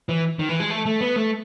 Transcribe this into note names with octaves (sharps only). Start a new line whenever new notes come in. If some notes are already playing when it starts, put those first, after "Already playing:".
E3
D#3
E3
G#3
A3
A3
B3
A3